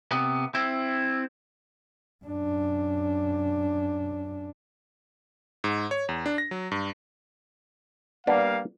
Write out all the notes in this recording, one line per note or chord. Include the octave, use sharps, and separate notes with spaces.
C3 B3
C4 E4
F#2 D4
G#2
C#5
E2
D4
A#6
F#3
G2
G3 A#3 B3 D4 F5